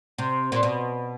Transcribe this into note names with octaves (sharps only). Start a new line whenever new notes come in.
C3
A#2
B2